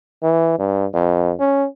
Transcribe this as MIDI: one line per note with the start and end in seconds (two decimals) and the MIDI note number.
0.23 0.58 52
0.59 0.86 43
0.94 1.32 41
1.40 1.66 61